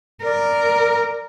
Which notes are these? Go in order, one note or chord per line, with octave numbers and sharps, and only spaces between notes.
A#4 D5